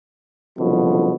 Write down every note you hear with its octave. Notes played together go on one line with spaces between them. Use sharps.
F#1 C2 B2 D3 F3